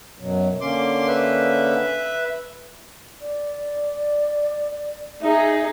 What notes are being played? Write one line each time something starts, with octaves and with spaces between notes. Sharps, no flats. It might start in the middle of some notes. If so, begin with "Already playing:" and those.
F#2 B2 F#3
D3 A#3 C#4 C6 D6
B4 E5
D5
D#4 G#4 E5